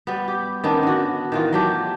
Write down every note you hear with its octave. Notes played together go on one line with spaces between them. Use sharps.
G3 B3
G4
D#3 B3 C#4 D4
D3 F#4
D#3 E3 F4
F#3 A3 G4